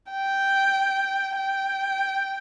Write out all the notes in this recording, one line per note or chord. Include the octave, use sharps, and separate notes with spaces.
G5
G5